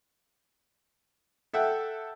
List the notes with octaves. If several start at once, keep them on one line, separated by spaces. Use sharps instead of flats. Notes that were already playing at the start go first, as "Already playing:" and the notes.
A4 E5 F#5 G5